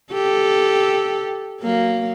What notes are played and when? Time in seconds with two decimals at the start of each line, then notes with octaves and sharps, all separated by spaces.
0.13 G4 A4
1.61 F#3 A#3